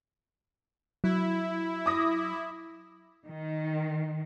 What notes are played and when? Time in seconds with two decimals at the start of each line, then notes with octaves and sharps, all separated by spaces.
1.04 F#3 E4
1.86 D6 D#6 A#6
3.28 D#3